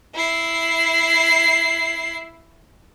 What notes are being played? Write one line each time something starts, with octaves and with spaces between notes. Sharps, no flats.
E4 C7